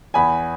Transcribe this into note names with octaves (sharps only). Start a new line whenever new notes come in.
E2 G#5 B5